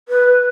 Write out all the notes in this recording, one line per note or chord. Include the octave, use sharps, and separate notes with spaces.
B4